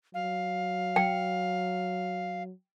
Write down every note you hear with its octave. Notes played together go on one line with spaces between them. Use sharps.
F#3 F5
G5